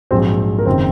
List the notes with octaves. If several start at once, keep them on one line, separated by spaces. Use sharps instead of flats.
A#1 G#2 F#3 C4 C5
A#4
F#1 D#3 C4 C5